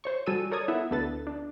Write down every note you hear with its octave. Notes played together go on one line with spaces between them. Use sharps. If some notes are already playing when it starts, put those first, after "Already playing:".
C5 C#5 C#6
G3 F#4 A4 G#5 E6 D#7
A4 A#4 C#5 D5 D#6 G#6
B3 E4 A4 E5 F#5
D2 B3 D4 A4 B4 A6
D4